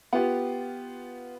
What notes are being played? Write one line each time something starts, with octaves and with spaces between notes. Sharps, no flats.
B3 F4 G4